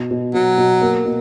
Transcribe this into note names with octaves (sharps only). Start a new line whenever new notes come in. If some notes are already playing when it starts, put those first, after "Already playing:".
Already playing: B2
B2
B2 F#3
B2
A#3
B2